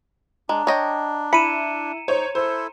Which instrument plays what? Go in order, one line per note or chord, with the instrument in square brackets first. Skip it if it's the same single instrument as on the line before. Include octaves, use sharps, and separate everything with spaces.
[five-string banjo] G#3 [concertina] D4 [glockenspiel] A#5
[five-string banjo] C#5 D#5 G5
[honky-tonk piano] E4 [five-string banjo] B5 [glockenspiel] C#7 D#7 E7
[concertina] D#4 [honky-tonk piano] C5 C#5
[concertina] E4 A4 [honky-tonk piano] C5